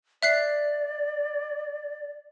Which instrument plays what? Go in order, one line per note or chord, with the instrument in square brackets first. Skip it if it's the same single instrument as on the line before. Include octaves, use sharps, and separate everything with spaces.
[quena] D5 [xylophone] E5 F#6 C7